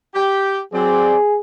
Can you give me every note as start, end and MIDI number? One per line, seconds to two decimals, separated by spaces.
0.14 0.60 67
0.14 0.60 79
0.73 1.15 54
0.73 1.15 60
0.73 1.40 68
0.73 1.15 74